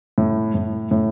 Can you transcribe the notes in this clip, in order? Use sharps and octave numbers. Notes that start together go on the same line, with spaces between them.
A2
A2
A2